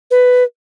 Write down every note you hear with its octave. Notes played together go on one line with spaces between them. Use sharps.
B4